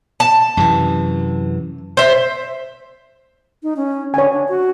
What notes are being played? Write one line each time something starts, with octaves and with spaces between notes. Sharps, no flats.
A5
F#2 C3 E3
C5 E5
D#4
C#4
D3 C#5 G#5
D4
F#4